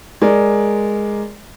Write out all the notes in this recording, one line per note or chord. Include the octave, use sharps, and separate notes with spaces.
G#3 A#4 D5